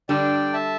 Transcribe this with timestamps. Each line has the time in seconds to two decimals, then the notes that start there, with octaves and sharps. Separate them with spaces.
0.09 D3 G3 D4 D5 G5
0.53 E5 A5